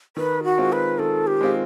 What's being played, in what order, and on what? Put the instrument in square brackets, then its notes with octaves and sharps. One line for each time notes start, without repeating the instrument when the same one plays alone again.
[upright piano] D#3 [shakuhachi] B4
[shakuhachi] F#4
[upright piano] G#3 C4 F4
[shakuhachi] B4
[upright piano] D#3 [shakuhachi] A4
[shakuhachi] G4
[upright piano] G#3 C4 F4